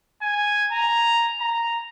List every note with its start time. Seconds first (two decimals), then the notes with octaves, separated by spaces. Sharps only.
0.22 G#5
0.72 A#5
1.40 A#5